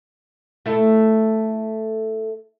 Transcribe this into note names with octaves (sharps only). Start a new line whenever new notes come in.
A3 E4 A4